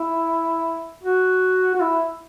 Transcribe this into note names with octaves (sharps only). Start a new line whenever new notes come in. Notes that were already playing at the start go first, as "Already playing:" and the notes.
Already playing: E4
F#4
F#4
E4